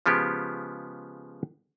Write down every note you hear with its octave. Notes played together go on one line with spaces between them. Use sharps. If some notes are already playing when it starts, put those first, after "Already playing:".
C#3 F3 G#3 B3 G4